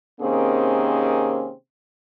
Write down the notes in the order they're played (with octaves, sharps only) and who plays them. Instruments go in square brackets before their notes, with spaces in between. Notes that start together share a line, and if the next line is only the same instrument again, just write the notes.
[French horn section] C3 D#3 A#3 C4 C#4 G#4